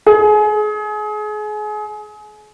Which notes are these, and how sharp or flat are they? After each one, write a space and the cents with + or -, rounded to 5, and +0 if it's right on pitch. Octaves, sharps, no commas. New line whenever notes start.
G#4 +30